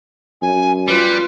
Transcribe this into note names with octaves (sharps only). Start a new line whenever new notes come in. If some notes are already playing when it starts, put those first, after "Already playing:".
F#2 G#5
G3 F4 B4